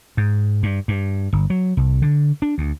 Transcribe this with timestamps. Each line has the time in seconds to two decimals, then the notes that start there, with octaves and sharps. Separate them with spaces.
0.17 G#2
0.63 G2
0.88 G2
1.33 G1
1.50 F#3
1.77 C2
2.02 D3
2.42 D4
2.58 D2